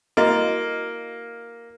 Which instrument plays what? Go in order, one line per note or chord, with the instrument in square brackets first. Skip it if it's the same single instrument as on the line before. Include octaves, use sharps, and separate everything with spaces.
[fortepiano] A#3 [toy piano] E4 F#4 D#5